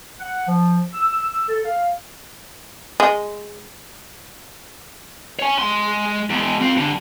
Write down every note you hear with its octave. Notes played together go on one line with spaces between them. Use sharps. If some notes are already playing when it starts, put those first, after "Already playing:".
F#5
F3
E6
A4
F5
G#3
C#5 G#5
G#3 C6
E2 G#3
C4 F4
G2 D3